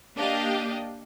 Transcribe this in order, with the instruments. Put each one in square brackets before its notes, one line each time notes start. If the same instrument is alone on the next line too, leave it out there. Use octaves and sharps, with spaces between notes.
[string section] A#3 D4 G4 D#5 F5 G5